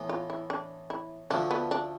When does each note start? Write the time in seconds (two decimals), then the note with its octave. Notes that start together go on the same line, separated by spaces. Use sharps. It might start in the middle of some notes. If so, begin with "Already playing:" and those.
Already playing: A2 E3 B3
0.09 F4
0.30 E4
0.50 D4
0.90 E4
1.30 D2 D3 F3 A3 D4
1.51 B3
1.71 D4